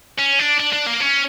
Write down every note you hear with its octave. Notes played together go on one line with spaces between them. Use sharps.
C#4
D4
D4
D4
A#3
C#4